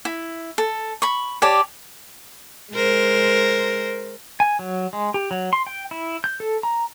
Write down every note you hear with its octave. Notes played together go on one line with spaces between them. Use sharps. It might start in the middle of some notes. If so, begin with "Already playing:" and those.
E4
A4
B5 C#6
G4 C#5 D5 A5
G#3 A#4 C5
G#5
F#3
G#3
G4
F#3
C6
G5
E4
G6
A4
A#5